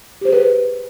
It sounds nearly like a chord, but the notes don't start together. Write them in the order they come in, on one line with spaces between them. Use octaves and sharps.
G4 C5 G#4 B4